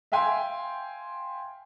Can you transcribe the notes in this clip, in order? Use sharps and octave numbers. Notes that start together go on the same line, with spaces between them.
E5 F5 G5 G#5 C6